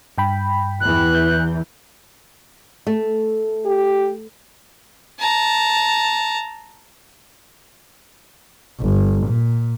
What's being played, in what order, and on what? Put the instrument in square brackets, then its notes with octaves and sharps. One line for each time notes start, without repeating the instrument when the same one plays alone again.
[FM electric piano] G2 G5 B5
[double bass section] E2 E3 [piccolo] F#6
[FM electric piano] G6
[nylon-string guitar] A3
[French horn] G4
[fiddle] A5 A#5
[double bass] G1
A#2